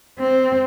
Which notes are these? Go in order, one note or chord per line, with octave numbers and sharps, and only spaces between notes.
C4